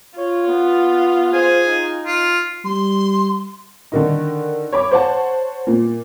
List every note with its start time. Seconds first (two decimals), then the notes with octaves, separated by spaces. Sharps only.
0.18 F4 C#5
0.48 B3
1.33 G#4 C5
1.67 D#4
2.06 F4
2.65 G3 C6
3.92 D3 D#3 D#4
4.72 C#5 B5 D6
4.91 C5 C#5 F#5 A5
5.67 A#2